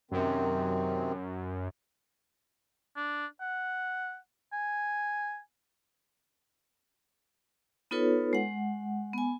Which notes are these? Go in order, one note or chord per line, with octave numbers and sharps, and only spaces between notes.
F#2 C3 D#3 C4
D4
F#5
G#5
B3 D#4 F4 A4 B4 C#5
G#3 F#5
B3 G#5